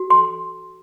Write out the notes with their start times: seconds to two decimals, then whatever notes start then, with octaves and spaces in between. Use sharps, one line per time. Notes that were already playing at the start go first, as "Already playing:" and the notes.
Already playing: F#4
0.10 A4 C6